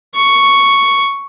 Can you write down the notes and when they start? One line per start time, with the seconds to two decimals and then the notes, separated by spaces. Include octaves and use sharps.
0.14 C#6